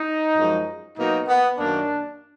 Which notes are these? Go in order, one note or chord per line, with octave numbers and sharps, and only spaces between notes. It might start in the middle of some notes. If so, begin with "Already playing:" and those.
Already playing: D#4
F#2 F3 G#3
B2 F#3 A#3 D#4
B3
F#2 D#3 A#3 D4